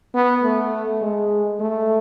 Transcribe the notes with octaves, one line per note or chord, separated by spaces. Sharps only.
B3
A3
G#3
A3